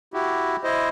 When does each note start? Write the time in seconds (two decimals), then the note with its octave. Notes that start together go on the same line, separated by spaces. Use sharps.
0.14 E4 F#4 G4
0.64 E4 C5 D#5